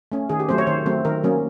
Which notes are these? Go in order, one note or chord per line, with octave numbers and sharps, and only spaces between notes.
A3 C#4
D#3 G#4
G4
F#3 A3 C4 C5
C#5
D#3 C5
F#3 A3 C4
D#3 A#4
F#3 A#3 C#4